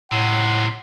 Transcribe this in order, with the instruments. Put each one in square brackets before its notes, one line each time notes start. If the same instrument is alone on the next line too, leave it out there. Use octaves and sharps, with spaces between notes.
[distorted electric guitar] C#2 C3 [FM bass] A2 [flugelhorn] F#5 [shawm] C6